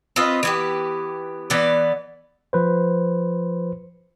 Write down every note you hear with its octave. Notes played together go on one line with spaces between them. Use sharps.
C4 F4 B4 D#5
E3 B3 G4
E3 B3 D5
F3 B4 C5